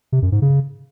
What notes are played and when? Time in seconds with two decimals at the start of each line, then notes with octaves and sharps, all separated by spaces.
0.12 C3
0.22 F#2
0.32 G#2
0.42 C#3